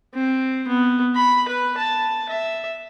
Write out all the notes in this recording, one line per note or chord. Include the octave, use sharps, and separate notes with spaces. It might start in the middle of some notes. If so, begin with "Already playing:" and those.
C4
B3
B5
B4
A5
E5